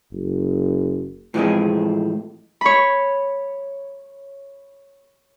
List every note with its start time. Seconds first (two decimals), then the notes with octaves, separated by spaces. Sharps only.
0.13 F#1
1.34 A2 E3 F3 G#3 C4 G#4
2.61 C#5 B5